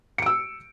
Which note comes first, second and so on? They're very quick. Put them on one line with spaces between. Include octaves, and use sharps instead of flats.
C#7 D7 E6